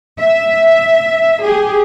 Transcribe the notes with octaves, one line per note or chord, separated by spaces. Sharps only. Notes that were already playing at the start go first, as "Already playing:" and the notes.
E5
G4 G#4